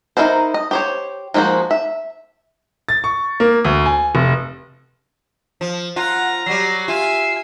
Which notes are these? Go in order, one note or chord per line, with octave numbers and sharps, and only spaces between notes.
D#4 E4 A#4 C5
D#5
G4 C5 C#5
F3 G#3 A#3 F#4 C5
E5
A6
C#6
A#3
D2
G#5
F1
F3
F4 F#5 A#5
F#3 G3 C7
F4 E5 G#5